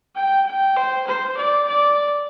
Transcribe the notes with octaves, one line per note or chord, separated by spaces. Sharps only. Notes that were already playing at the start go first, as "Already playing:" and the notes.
G5
G5
C5
C5
D5
D5